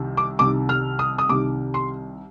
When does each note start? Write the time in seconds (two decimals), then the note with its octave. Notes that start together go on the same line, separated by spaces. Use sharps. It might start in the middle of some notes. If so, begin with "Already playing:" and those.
Already playing: C2 C3 D#3
0.17 D6
0.39 C2 C3 D#3 D6
0.69 F6
0.99 D#6
1.18 D#6
1.29 C2 C3 D#3 D6
1.74 C6